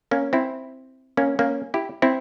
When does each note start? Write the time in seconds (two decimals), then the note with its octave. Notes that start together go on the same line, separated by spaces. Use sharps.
0.11 A#3 C#4
0.33 C4 E4
1.17 A#3 C#4
1.39 A#3 C#4
1.74 E4 G4
2.02 C4 E4